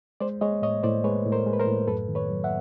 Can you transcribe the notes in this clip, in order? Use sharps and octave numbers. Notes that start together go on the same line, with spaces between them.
G#3 C5 D5
G#3 C#5 D#5
A2 C#5 D#5
A2 C5 D5
G#3 B4 C#5
A2
A#4 C5
G#3
B4
A#4 C5
A2
F#2 A4 B4
D#3
B4 C#5
F#3
E5 F#5